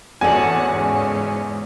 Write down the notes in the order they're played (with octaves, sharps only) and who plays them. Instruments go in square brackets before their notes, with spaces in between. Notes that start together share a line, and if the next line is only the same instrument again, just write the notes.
[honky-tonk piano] E2 [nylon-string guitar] F#4 A4 D5 [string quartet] C#5 F#5 A5 [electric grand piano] G#5
[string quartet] G#2 C#3 C#4